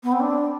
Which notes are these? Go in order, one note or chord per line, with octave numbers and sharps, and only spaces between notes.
B3
C4
D4